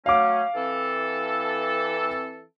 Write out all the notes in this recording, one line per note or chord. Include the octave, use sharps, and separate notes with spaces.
F#3 A3 C#4 F5 D6
E3 C4 A4